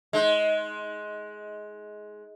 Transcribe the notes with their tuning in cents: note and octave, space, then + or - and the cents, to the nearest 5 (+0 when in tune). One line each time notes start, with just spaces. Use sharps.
G#3 +15 D#4 +25